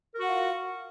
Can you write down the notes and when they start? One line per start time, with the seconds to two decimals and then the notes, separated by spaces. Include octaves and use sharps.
0.15 A#4
0.19 F#4
0.23 F#5
0.26 F4